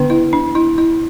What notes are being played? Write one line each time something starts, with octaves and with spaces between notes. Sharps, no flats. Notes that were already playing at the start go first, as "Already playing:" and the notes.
Already playing: D3 B3 D4
E4
D4
E4
E4